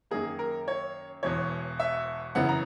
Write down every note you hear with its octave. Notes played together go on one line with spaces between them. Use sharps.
F#2 D#3 A#3 G#4
A#4
C#5
E1 E2 B2 C#5
E5
F#2 C#3 E3 B3 F#5
A#5